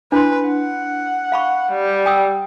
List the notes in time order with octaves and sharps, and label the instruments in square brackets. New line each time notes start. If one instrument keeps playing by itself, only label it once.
[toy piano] D4 E4 C6 [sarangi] B4
[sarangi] F#5
[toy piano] F5 B5 C#6
[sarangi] G3
[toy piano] G5 D#6 E6